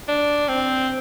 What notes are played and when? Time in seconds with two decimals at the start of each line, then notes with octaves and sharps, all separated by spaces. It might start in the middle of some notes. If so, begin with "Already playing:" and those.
0.08 D4
0.48 C4